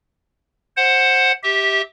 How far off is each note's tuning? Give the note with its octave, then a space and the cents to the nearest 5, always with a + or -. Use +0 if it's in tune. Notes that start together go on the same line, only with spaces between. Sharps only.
C5 +15 F#5 +0
G4 +0 E5 -25